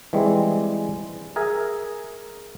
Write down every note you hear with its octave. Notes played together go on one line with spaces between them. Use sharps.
E3 G3 G#3 C4
G#4 A#4 E5 G#5